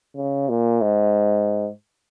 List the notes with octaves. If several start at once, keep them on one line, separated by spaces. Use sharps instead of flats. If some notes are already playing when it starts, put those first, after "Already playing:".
C#3
A#2
G#2